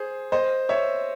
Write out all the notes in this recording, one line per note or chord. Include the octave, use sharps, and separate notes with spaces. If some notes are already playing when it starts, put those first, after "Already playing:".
Already playing: G#4 C5
C5 D#5
C#5 E5